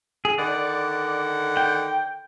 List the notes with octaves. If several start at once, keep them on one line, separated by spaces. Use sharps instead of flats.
G#4
D3 D#3 D5 F#5
G5